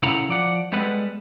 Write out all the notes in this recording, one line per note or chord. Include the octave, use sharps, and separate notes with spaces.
C#3 E4 A4 F#5 A#5 B5
F3 D5 F#5
G3 G#3 B3 A4 B4 F#5